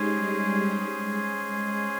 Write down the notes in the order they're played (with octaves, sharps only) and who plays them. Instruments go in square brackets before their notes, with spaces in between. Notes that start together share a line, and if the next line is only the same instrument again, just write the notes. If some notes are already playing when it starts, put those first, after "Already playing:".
Already playing: [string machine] G#3 D#4 G4 [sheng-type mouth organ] C#4 G#4 C5
[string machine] G3
G3
G#3